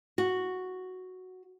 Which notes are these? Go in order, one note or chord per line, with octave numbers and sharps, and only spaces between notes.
F#4